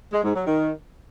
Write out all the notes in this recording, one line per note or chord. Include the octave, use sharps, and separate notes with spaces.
G#3
G#2
F#3
D#3